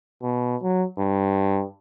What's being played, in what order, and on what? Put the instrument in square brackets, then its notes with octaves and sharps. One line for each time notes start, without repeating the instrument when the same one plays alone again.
[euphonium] B2
F#3
G2